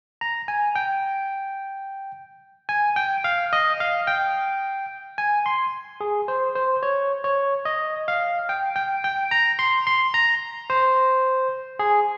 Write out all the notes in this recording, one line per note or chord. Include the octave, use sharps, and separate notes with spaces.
A#5
G#5
G5
G#5
G5
F5
D#5
F5
G5
G#5
C6
G#4
C5
C5
C#5
C#5
D#5
F5
G5
G5
G5
A#5
C6
C6
A#5
C5
G#4